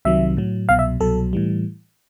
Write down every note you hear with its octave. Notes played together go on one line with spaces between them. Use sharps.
C2 C3 D#3 F#3 E5
A2 F#3
C2 B2 F#3 F5
E5
C2 B2 F#3 A4
A2 E3 G3